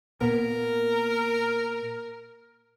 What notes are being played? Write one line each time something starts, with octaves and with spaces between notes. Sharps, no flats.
A#2 A#3 B3 A#4